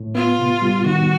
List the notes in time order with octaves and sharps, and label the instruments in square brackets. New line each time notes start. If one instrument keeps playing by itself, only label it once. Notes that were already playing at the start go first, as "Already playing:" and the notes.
Already playing: [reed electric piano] A2
[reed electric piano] B3 [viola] F4
[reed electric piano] C3
G3
[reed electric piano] D#3 [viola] F#4